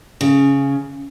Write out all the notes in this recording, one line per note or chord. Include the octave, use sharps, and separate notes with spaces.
C#3